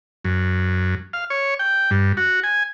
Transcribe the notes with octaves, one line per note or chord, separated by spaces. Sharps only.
F#2
F5
C#5
G5
G2
F#4
G#5